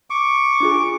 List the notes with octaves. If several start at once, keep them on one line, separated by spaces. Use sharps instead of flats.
C#6 D6
D4 F4 G#4